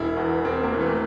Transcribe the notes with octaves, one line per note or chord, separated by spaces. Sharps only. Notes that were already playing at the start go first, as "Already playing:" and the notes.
Already playing: E1 E4
E2 E3
E1 C4
A#3
E2 E3
A3